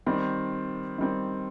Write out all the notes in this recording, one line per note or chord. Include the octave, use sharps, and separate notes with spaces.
D#3 G3 C4
D#3 G3 C4